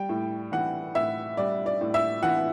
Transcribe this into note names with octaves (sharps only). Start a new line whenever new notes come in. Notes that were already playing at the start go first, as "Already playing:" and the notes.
Already playing: G3 G5
A2
E3 F#5
A2 E5
G3 D5
D5
A2
E5
E3 F#5